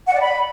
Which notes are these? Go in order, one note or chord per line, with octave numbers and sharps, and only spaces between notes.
F#5
D5
B5